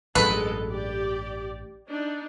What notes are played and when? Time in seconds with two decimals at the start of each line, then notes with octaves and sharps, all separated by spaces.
0.15 A1 G2 F#3 G#3 A4 B4
0.70 G4 D5
1.89 D4 D#4